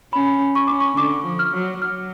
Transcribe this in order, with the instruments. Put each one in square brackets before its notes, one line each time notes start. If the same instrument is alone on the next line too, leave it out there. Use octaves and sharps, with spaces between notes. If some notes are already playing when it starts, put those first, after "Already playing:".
[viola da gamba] C#4 [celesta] B5
[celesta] C#6
[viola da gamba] C#4 [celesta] D6
[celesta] C#6
[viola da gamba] D3 [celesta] D6
[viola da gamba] F3
[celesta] F6
[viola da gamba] F#3
[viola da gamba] F#3 [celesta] F6